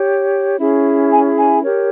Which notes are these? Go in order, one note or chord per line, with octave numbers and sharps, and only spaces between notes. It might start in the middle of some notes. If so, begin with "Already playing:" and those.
Already playing: G4 C#5
C#4 E4 G#4
G#5
G#5
G4 A#4 C#5